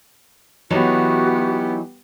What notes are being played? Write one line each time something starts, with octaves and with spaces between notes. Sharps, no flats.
E3 F#3 B3 D#4 F#4 G4